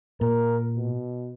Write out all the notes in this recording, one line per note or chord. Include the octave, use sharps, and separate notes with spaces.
A#2 A#4
B2